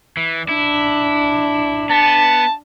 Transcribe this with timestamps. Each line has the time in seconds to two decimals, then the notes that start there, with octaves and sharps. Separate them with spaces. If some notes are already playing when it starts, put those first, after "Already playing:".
0.17 E3
0.49 D4 E4
1.90 B3 A5